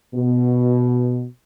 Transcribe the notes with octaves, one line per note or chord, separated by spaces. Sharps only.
B2